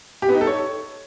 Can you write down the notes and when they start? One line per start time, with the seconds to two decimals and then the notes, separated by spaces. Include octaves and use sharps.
0.22 G4
0.29 B3
0.35 D#4
0.41 A4
0.47 C#5